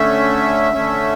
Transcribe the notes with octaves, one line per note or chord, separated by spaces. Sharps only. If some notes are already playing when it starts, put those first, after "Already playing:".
Already playing: D3 A3 C#4 E5
D3 A3 C#4